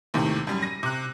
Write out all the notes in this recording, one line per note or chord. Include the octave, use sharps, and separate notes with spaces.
D#2 A2 C3 D#3
F#2 G3
A#6 D#7
C3 F#6